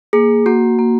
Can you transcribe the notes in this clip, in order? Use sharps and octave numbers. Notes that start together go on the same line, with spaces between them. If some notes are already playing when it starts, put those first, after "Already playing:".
A#3 G#4
A#3 F#4
A#3